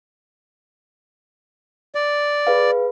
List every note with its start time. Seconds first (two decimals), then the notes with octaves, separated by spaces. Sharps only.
1.95 D5
2.47 G#4 B4 F5